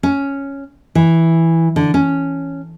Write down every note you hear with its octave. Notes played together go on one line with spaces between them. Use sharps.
C#4
E3
D3
C#4